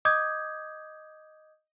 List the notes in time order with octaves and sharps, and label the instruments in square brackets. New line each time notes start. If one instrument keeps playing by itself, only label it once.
[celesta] D#5 D6 D#6 G6 G#6